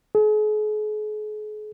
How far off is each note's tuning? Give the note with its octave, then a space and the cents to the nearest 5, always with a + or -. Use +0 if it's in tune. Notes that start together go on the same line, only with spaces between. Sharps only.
G#4 +40